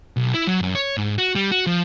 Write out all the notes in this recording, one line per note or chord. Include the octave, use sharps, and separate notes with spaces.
B1
E4
F#3
F#2
C#5
G#2
F#4
G3
F#4
F3